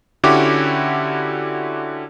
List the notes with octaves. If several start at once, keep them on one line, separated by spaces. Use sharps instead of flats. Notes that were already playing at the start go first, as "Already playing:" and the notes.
D3 C#4 E4 F#4 G4 D6